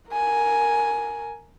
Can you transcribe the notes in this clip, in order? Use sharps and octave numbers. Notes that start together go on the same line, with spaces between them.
A#4 G#5